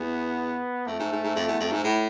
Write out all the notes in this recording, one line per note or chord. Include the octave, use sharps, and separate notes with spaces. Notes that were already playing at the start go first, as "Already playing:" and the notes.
Already playing: E2 B3
F2 A3
G#2
G#2
G#2
F2
E2
F2
G#2
A2